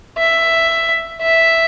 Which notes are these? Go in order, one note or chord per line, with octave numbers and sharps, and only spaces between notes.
E5
E5